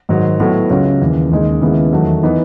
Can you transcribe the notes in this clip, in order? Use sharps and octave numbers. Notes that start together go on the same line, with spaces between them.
G#2 D#3 F#3
A2 F#3 B3
C#2 C#3 F#3 C#4
D#2 C#3 E3
D#2 C#3 G#3 D#4
D#2 C#3 G#3 B3 E4
E2 D#3 F#3 A3
E3 B3 D#4